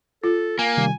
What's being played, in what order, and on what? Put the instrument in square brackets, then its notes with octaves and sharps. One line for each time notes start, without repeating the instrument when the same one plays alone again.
[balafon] F4 [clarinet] A4
[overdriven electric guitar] A#3 [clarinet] G#5
[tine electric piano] C3 D#3 G3